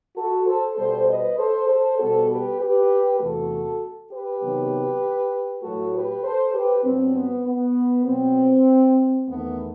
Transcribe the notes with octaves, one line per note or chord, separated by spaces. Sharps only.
F#4 A4
A4 C5
B2 G3 B3 A4 C5
B4 D#5
A4 C5
A4 C5
B2 G3 B3 F#4 A4
G4 B4
G4 B4
E2 C3 E3 A3 F#4 A4
G4 B4
C3 D#3 F#3 B3
A2 F#3 A3 F#4 A4
G4 B4
A4 C5
G4 B4
G2 F#3 B3 C4
B3
B3
B2 F#3 B3 C4
E2 D#3 A3 B3